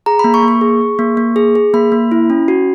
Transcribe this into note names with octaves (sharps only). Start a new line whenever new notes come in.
G#4 A#5
A#3 B5
C#6
A#3
C#6
G#4
G#4
A#3
A#3
G#4
G#4
A#3 B5
A#3
E4
C#4
F#4